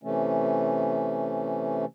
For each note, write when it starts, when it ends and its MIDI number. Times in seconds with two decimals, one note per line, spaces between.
0.03 1.85 48
0.03 1.85 52
0.03 1.85 57
0.03 1.85 61